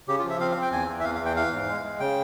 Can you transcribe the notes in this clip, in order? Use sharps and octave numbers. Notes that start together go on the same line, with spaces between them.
C#3 G4
F4
F3
E5
C4 F5
F5
C4 G5
E2 G#5
E3
E5
E2 F5
F5
E3
G5
E3 F5
G#2
G#3
G#3
C#3 G5